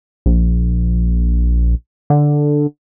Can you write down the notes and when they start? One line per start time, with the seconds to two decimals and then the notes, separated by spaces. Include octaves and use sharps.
0.26 A#1
2.10 D3